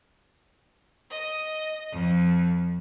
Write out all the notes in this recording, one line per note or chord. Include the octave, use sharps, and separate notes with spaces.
D#5
F2